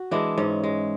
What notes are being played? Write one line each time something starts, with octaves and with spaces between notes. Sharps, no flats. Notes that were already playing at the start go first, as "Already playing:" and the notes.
Already playing: F#4
E3 G#3 D4
G#2 C#4
G#3